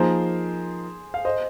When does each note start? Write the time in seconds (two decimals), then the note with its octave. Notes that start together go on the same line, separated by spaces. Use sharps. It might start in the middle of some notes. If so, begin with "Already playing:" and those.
Already playing: F3 A#3 D#4 G#4 A#4 C5
1.14 F5
1.25 C5 D#5